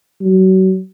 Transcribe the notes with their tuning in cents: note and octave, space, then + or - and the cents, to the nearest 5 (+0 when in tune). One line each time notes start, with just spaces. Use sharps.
F#3 +30